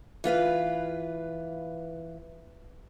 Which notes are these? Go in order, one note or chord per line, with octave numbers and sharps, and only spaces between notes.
E3 F4 B4 F5